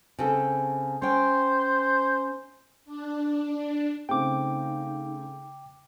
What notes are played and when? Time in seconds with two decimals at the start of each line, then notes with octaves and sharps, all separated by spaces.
0.19 C#3 C4 A4
1.02 C#4 C5 G5
2.85 D4
4.09 C#3 A3 C4 D#4 G5 D6